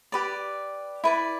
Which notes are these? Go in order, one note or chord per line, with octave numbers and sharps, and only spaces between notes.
G4 B4 D5
E4 B4 D5